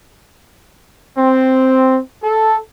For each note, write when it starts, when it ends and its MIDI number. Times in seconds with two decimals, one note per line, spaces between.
1.18 1.99 60
2.24 2.58 69